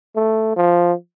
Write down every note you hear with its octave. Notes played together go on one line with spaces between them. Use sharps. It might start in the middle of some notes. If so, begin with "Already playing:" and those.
A3
F3